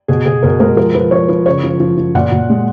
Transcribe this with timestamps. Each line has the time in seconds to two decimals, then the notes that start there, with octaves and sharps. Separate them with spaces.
0.08 B2 G#4
0.26 B2 G#4
0.43 B2 A#4
0.60 G#3 A#4
0.77 F3 A#4
0.94 F3 B4
1.11 F3 C#5
1.28 F3 B4
1.46 C#3 C#5
1.64 F3
1.80 F3
1.97 F3
2.15 A#2 F#5
2.32 A#2
2.50 G#3